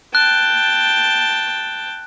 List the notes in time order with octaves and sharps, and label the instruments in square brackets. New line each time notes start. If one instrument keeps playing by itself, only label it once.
[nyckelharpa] G5 A5 [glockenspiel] F#6